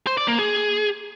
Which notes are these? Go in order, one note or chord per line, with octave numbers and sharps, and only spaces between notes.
C5
D5
A#3
G#4